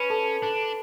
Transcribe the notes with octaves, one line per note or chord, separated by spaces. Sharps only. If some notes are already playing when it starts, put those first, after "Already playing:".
Already playing: C#4 B4 B5
A4 A5
D4 A4 A5